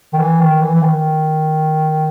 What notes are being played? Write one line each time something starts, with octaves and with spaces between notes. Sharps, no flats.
D#3
E3
D#3
E3
E3
D#3